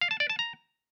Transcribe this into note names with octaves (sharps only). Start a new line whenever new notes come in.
F5
A5
D5
A5
A#5